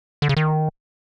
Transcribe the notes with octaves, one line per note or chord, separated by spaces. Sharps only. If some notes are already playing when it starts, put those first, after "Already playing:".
D3
C#3
D#3